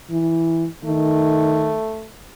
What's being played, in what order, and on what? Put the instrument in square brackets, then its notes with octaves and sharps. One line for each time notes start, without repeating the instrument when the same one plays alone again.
[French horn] E3
[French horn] D#3 [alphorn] A3